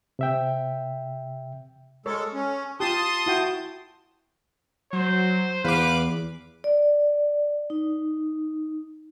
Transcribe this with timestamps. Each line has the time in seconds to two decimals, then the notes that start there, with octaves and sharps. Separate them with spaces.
0.19 C3 E5 G5
2.06 G#3 A4 A#4 C#5
2.33 C#4
2.80 F4 G4 A5 C6 D#6
3.26 E4 F#4 G5
4.93 F#3 C5
5.64 E2 B4 F5 D6
6.64 D5
7.70 D#4